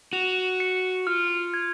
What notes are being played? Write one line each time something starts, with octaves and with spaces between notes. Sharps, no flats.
F#4 F7
C#7
F4 F6
G#6